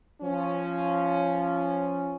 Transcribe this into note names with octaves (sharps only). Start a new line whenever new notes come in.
F3 C#4